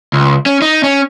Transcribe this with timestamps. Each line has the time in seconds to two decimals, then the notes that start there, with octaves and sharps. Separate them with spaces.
0.13 C#2
0.46 C#4
0.62 D#4
0.84 C#4